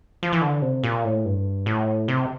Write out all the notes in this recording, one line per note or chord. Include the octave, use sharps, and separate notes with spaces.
F3
E3
D3
C3
A#2
A2
G2
A2
C3